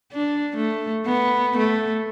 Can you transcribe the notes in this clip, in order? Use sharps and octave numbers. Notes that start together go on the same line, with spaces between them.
D4
A3
B3
A3